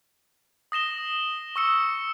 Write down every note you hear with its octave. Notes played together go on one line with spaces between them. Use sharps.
D#6 A#6 E7 G7
C#6 E6 C#7